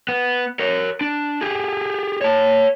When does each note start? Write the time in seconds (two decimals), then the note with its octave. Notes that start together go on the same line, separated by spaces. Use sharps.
0.09 B3
0.59 A#4 C#5
1.01 D4
1.41 G4 G#4
2.21 C#5 A5